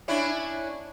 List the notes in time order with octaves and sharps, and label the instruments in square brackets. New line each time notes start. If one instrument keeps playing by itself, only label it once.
[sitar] C#4 D4 E4